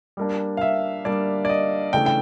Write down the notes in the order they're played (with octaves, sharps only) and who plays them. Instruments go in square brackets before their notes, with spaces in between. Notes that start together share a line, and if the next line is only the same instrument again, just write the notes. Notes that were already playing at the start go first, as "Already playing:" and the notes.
[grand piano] G3 A#3 D4
[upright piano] F5
E5
[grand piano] G3 A#3 D4 [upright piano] D5
[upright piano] D5
D#5
[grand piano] C#3 E3 A3 D4 [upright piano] G5
[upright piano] G5